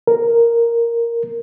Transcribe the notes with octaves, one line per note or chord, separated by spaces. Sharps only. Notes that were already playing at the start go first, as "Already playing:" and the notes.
A#4